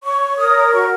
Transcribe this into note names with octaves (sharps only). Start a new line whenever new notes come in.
C#5 C#6
A#4 D#6
F#4 C#6